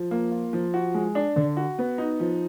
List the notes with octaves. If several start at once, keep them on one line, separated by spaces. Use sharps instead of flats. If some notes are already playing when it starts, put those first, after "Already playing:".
Already playing: F3
A#3
F4
F3
F#4
G#3
D4
D3
F#4
B3
D#4
F3